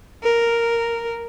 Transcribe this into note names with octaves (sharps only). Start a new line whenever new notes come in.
A#4